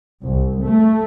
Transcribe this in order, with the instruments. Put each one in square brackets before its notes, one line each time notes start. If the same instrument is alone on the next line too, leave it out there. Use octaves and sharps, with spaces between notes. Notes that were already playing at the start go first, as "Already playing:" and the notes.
[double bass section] C2
A3